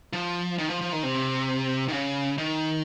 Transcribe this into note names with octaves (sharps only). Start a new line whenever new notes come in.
F3
D#3
F3
F3
D#3
C3
D#3
C#3
D#3